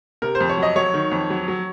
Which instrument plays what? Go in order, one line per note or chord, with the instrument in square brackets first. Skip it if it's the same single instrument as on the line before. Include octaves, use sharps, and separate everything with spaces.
[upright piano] C3 A#4
C5
F2
C#5
F#3 D#5
F#3 C#5
D#3
F2
F#3
F#3